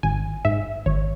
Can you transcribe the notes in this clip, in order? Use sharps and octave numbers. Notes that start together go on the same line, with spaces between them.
G#1 G#5
G#2 E5
G#1 C#5